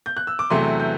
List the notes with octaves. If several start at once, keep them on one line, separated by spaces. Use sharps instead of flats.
G6
F#6
E6
D6
E2 C3 F#3 A3 C6
G6